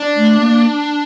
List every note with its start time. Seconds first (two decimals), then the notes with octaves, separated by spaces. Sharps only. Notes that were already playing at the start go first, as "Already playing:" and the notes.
Already playing: D4
0.16 A3
0.38 A#3